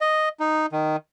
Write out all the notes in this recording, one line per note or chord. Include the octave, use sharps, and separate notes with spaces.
D#5
D#4
D#3